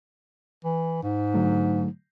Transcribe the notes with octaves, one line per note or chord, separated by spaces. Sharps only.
E3
G#2
D3 F#3 A3